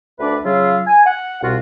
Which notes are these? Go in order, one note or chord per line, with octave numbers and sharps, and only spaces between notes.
D2 D4 B4 D5 E5
C#3 F#3 F4 E5 F5
G#5
F#5
C2 B2 F4 F#4